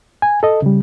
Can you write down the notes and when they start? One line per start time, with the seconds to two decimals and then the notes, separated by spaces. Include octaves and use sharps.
0.22 G#5
0.43 A4 D#5
0.62 C#3 G3